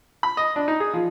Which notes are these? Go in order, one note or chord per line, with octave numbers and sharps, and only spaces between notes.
B5
D#5
D4
D#4
G#4
F3